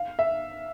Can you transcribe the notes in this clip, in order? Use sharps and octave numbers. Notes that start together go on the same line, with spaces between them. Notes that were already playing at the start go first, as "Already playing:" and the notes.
Already playing: F5
E5